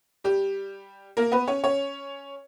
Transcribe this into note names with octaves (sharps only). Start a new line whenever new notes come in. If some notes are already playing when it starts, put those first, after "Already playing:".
G3 G4
A#3 A#4
B3 B4
C#4 C#5
C#4 C#5